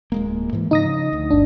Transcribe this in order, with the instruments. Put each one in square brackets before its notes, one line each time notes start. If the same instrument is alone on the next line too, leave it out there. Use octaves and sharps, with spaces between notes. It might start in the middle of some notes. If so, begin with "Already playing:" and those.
[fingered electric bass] D1 G#3 A#3
G#2 E3
[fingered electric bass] C#3 F3 [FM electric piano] D#4 D#6 A#6
[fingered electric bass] D2
[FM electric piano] G1 D4